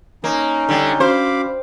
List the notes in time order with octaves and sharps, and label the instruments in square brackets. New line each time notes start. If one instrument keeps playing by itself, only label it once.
[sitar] A#3 [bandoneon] C#4 D#4
[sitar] D3 G3
[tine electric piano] C#4 F#4 [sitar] C5 [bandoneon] F5 B5 D6